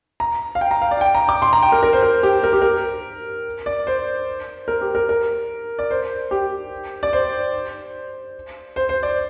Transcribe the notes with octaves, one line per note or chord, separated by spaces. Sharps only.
A#5
F5
G5
A#5
F5
D5
G5
A#5
D6
C6
A#5
G5
A#4
A#4
C5
A#4
G4
A#4
G4
A#4
D5
C5
A#4
G4
A#4
A#4
D5
C5
G4
D5
C5
C5
C5
D5